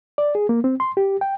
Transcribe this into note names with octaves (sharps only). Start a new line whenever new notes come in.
D5
G#4
A#3
C4
C6
G4
G5